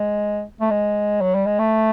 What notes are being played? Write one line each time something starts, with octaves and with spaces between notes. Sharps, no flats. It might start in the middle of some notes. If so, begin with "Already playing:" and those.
Already playing: G#3
A3
G#3
F#3
G3
G#3
A3